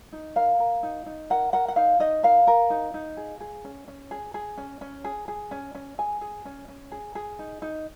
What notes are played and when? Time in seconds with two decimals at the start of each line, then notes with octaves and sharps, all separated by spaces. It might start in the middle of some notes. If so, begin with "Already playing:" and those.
0.13 D#4
0.36 A#4 F5
0.60 A#4
0.83 D#4
1.06 D#4
1.30 A#4 F#5
1.53 A#4 F#5
1.68 F#5
1.76 D#4 F5
2.00 D#4 D#5
2.23 A#4 F5
2.47 A#4
2.70 D#4
2.94 D#4
3.17 G#4
3.40 G#4
3.64 C#4
3.88 C#4
4.11 G#4
4.34 G#4
4.58 C#4
4.81 C#4
5.04 G#4
5.28 G#4
5.51 C#4
5.75 C#4
5.98 G#4 G#5
6.21 G#4
6.45 C#4
6.68 C#4
6.92 G#4
7.15 G#4
7.39 D#4
7.62 D#4